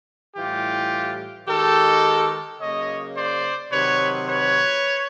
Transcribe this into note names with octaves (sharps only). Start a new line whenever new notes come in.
A2 E3 G3 F4 G4
D#3 G#3 G4 A4
C#3 F#3 A#3 C#5 D#5
C5 D5
C3 D#3 F#3 B4 C#5
B4 C#5